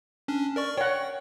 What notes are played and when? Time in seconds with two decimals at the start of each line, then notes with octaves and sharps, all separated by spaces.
0.28 C#4 D4
0.56 A#4 D5 C#6
0.78 C#5 F#5 G5